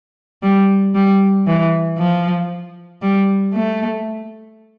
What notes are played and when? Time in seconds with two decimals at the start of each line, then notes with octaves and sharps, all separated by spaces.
0.43 G3
0.95 G3
1.47 E3
1.99 F3
3.02 G3
3.54 A3